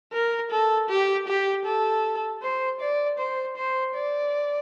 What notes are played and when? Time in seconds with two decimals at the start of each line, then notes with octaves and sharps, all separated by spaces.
0.13 A#4
0.51 A4
0.89 G4
1.28 G4
1.65 A4
2.42 C5
2.80 D5
3.18 C5
3.56 C5
3.94 D5